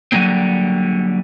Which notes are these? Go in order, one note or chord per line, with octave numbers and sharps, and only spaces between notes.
D3 F#3 G3 A#3 C4